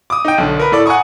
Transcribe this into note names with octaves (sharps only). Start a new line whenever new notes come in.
D6 D#6
D#4 G5
B1 D3
A#4 B4
A2 A4 D5
F#5 G#5 A#5 C#6 D#6